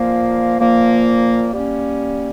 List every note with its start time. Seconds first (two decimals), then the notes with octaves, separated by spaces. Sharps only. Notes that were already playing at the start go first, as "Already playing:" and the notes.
Already playing: A#2 F3 A#3
0.59 A#2 F3 A#3
1.53 G3 A#3 C#4